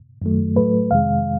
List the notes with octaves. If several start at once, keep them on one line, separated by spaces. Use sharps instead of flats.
F#2 D#3 F#3 A3
A2 F#3 A3 B4
F2 C3 D#3 G#3 F5